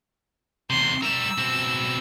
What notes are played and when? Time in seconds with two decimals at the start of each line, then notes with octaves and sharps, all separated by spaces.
0.70 E2 C3 C6
1.03 G3 A#4 E6
1.38 B2 C4